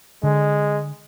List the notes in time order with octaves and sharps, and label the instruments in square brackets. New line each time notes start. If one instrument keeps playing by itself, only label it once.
[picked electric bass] D3 [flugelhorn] G#3